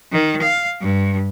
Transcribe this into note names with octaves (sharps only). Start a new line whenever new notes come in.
D#3
F5
G2